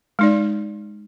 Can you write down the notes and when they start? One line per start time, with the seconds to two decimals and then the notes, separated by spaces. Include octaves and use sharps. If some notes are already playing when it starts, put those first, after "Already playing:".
0.19 G#3 D#4 D5